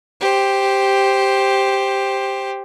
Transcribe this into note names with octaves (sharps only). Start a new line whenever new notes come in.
G4 C5